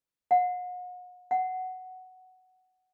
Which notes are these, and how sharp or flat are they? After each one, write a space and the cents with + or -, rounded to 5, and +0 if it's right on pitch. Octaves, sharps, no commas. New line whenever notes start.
F#5 -40
F#5 +5